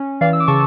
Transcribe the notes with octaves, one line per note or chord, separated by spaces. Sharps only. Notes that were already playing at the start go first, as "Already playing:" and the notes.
Already playing: C#4
E3 D5 F5
E6
D6
C#3 A5 C#6